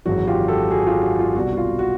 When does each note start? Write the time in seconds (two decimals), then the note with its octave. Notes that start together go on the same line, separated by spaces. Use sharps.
0.05 G#1 F#2 C#3 E3 F#4
0.27 F4 G4
0.48 G4 A4
0.70 F#4 G#4
0.87 F4 G4
1.03 F#4
1.19 F4
1.35 C2 B2 F#4
1.53 F#4
1.57 F4
1.79 F#4